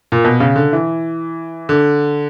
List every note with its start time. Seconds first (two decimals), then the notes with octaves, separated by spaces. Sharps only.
0.12 A#2
0.24 B2
0.40 C#3
0.56 D3
0.73 E3
1.69 D3